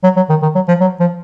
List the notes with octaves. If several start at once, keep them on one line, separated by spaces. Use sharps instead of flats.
F#3
F#3
D#3
D#3
F#3
F3
F#3
F3